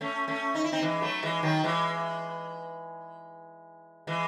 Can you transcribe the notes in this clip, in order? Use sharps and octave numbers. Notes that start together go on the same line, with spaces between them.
A3 C#4
A3 C#4
D#4
E4
C4 D#4
E3 G#3
F#3 A3
E3 G#3
D#3 F#3
E3 G#3
E3 G#3